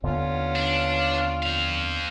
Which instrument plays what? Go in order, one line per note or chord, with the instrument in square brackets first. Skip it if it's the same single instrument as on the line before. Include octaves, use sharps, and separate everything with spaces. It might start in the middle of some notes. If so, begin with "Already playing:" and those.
[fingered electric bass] D#2 D3 B3 [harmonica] C#4 F4
[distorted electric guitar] D4
C4 F5